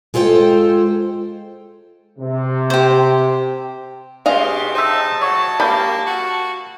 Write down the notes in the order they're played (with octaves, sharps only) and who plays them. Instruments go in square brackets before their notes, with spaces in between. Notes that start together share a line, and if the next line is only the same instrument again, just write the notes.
[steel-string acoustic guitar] G#3 F4 A4 C5 G5
[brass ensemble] C3
[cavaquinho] G4 C5
[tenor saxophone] B2 [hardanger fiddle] G4 C6 [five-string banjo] G#4 D#5 F5
[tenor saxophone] D#4 [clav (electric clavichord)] C5 E5 [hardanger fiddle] A5
[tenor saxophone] F#3 [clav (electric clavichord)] C#5
[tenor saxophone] A#3 [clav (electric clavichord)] G4 [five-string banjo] B5
[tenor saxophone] F#4